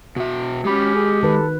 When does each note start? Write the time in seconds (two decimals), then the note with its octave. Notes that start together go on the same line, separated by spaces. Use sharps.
0.16 B2 F#4 E5
0.65 G#3 C#4 G4 B5
0.95 G#4
1.23 D#3 A4 B4